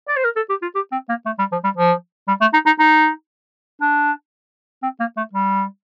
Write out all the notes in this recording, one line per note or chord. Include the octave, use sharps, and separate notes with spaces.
D5
C5
A#4
A4
G4
F4
G4
C4
A#3
A3
G3
F3
G3
F3
G3
A3
D#4
D#4
D#4
D4
C4
A#3
A3
G3